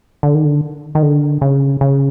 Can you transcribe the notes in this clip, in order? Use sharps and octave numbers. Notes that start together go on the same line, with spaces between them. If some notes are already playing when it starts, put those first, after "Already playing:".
D3
D#3
D3
D#3
D3
C#3
C#3